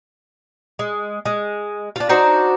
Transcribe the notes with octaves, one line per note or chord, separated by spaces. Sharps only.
G#3
G#3
D4 F4
D4 D#4 F#4 C5